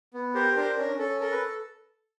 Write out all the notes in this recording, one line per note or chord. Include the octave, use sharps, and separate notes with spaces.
B3
G4 A#4 C5
D4 A#4 C5
C#4 A#4
C#4 A4
A4 A#4
B4